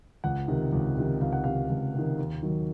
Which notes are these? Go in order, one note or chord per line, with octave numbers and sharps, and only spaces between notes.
C#2 F#5
C3 D#3
C#2
C3 D#3
C#2 F5
F#5
C3 D#3 F5
C#2
C3 D#3
D#2
D#3 F#3